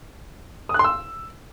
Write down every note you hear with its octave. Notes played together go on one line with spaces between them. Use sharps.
D#6
F#6
C6
E6